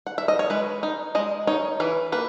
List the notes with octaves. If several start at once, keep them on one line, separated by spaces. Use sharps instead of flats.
F#5
E5
D#5
C#5
G#3 B4
D#4
G#3 D#5
D#4 C#5
E3 B4
A#3 B4